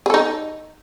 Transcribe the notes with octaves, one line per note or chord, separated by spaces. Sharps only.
D#4 G#4 A4